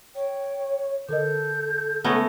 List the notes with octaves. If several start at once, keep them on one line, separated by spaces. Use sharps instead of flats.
C#5 G5
D3 A4 A#4 D#5 G6
C#3 G#3 A3 B3 C#4 F#6 A#6